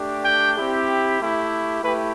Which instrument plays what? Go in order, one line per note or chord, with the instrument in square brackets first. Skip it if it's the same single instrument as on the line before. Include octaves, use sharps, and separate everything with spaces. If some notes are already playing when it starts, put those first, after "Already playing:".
Already playing: [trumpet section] A3 D4 G4
G5
C4 E4 G4
A3 E4 G4
A3 E4 G4 B4